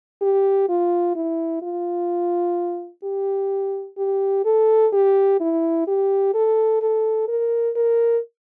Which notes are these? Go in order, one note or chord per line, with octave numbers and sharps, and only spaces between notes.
G4
F4
E4
F4
G4
G4
A4
G4
E4
G4
A4
A4
A#4
A#4